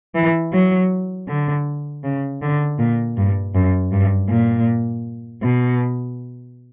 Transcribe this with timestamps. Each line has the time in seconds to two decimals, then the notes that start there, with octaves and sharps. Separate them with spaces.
0.15 E3
0.53 F#3
1.28 D3
2.04 C#3
2.42 D3
2.79 A#2
3.17 G2
3.55 F#2
3.92 G2
4.29 A#2
5.42 B2